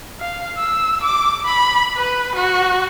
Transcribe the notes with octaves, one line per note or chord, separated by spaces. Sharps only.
F5
E6
D6
B5
B4
F#4